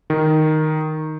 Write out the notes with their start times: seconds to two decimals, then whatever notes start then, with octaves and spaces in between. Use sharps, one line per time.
0.10 D#3